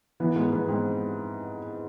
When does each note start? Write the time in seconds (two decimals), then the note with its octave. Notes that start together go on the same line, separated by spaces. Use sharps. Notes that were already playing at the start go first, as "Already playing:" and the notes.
0.20 E3 B3
0.36 G#2 B3
0.52 G#2 B3
0.68 G#2 C4